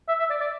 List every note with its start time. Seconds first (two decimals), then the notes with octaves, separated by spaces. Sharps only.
0.08 E5
0.19 E5
0.30 D5
0.41 D5